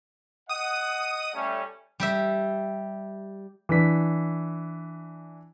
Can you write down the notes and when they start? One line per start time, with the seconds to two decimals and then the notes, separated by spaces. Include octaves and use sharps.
0.49 D#5 F#5 D#6 D#7
1.34 G3 A3 C#4
2.00 G3 G4 E5
3.69 E3 D4 B6